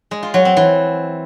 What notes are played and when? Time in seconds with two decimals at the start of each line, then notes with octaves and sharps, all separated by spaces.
0.11 G#3
0.23 F4
0.34 F#3
0.45 C4
0.57 E3